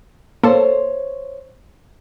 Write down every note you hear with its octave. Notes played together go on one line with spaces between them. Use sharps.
A#3 A4 C5 C#5